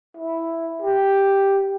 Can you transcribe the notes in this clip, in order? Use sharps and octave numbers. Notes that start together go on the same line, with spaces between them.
E4
G4